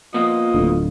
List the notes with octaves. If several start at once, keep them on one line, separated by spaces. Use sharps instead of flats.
F3 A#3 B3 F4 D#5
D1 A2 D3